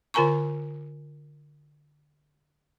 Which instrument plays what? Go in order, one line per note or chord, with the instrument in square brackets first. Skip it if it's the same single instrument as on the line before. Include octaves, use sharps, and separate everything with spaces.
[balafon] D3 F4 A#4 G#5 A#5 C#6